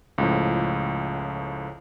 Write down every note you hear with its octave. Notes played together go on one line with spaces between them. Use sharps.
C#2 A2 F3